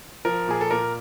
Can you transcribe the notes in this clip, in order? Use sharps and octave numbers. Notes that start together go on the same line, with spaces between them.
F3 A#4
A#2 G#4
A4
A#2 A#4